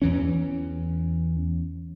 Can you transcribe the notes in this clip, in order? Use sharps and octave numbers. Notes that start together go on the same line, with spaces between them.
E2 E3 C#4